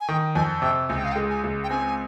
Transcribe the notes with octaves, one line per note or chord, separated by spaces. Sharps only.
G#5
D#3 G5
F2 G#5
C3 G5
C#2 G#5
G5
F5
G5
G#3
G#5
C#2
G5
C4 G#5